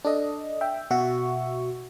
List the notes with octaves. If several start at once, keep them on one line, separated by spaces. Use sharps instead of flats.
D4 A4 D#5
E5 G5
B2 F#4 E5 C#6